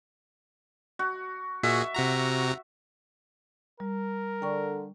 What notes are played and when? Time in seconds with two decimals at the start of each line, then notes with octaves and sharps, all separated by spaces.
0.99 F#4
1.63 A#2 F#4 G#4 E5
1.94 C3 F#4 A#5
3.80 G3 A#4
4.42 D3 G5 C#6